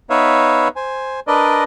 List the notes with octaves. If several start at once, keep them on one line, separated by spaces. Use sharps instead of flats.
B3 D#4 B4 C#5 E5 F5
C5 G#5
D4 A#4 B4 D5 D#5